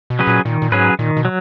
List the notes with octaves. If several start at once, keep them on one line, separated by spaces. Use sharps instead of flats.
B2
F#3 C#4 G#4 B4
A#2
A#2 D#3
A#2
G#2 F#3 C#4 G#4 B4
A#2 D#3
B2
F#3